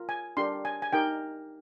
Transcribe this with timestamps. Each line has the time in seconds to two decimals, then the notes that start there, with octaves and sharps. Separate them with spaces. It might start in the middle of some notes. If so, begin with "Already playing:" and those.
Already playing: F4 A#4
0.09 G#5
0.37 D4 G4 A#4 C6
0.65 G#5
0.82 G#5
0.93 D#4 G4 A#4 G5